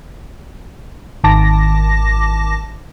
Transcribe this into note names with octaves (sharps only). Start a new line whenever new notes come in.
G#1 D#3 A5 D6 A#6